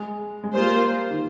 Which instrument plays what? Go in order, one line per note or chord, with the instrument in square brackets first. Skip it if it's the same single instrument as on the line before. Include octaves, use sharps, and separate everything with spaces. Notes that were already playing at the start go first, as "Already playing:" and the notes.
Already playing: [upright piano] G#3
G#3
[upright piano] G3 [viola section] A#3 F4 C5
[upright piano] D#3